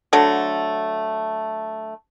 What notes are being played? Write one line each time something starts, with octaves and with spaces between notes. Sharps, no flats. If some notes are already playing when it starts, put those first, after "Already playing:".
D3 F#3 A3